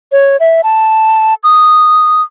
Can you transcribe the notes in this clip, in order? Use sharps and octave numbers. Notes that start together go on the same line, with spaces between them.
C#5
E5
A5
D#6